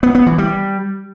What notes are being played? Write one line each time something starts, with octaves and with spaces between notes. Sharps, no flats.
B3
B3
E3
G3